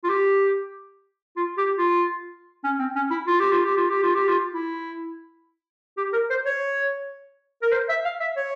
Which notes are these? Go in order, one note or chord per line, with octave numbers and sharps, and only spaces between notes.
F4
G4
F4
G4
F4
C#4
C4
C#4
E4
F4
G4
F4
G4
F4
G4
F4
G4
F4
E4
G4
A#4
C5
C#5
A#4
C5
E5
F5
E5
C#5